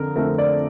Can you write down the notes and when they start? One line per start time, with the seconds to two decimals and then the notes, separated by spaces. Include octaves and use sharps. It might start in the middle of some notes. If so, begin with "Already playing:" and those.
Already playing: F2 D3 A#4
0.16 F2 D3 A3 C4 A#4
0.38 D5